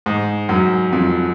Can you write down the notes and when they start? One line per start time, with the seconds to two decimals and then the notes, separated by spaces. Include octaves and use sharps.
0.06 G#2
0.49 F#2
0.92 F2